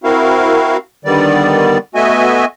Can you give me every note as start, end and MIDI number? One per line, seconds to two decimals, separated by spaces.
0.04 0.77 60
0.04 0.77 64
0.04 0.77 66
0.04 0.77 70
0.04 0.77 77
1.05 1.78 50
1.05 1.78 51
1.05 1.78 55
1.05 1.78 59
1.05 1.78 74
1.95 2.45 57
1.95 2.45 59
1.95 2.45 66
1.95 2.45 75
1.95 2.45 76
1.95 2.45 80